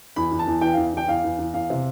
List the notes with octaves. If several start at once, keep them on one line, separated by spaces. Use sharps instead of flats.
E2 B5
E2
A5
E2
E3 G5
E2 F5
E2 G5
E2 F5
E2
E2
E2 F5
C3